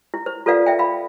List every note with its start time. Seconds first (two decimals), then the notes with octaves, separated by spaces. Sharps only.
0.14 E4
0.26 C5
0.46 F4 A4 B4 D5 F5 F#5
0.66 E5 G5
0.79 F5 B5